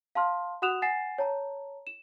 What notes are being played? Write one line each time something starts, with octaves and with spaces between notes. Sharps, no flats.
F5 A5 C6 F6
F#4 F#5 D#6 F#6 E7 F7
F#5 G#5 A6 C7 E7
C#5 A5 A#5
E7